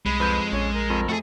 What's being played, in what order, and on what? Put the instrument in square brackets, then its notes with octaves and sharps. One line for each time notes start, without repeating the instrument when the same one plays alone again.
[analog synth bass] C2 [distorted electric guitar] G#3 [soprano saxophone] B5
[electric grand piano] F2 G6 [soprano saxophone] B4
[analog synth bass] A#1 [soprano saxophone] C#4
[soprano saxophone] A#4
[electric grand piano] F2
[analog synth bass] A3 [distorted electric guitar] F#4 G#4 [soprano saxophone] A4